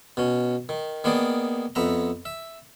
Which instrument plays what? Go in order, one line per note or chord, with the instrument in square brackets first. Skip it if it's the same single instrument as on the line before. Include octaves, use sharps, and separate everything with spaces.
[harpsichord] B2 C#4
D#3
D#3 A#3 B3 G#4 D5
F2 B3 E5 A#5
E5